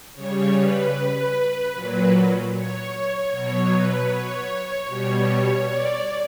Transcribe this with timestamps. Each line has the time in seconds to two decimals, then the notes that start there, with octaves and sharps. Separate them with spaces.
0.15 C#3 G3 C#5
0.55 B4
1.73 A#2 F#3 B4
2.52 C#5
3.30 B2 F#3 C#5
3.69 B4
4.09 C#5
4.87 B2 G3
5.66 D5